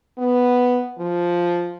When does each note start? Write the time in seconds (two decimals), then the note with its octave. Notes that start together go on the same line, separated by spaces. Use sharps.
0.18 B3
0.98 F3